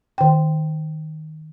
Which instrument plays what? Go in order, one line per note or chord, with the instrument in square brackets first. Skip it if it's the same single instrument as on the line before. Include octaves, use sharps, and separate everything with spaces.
[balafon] D#3 G5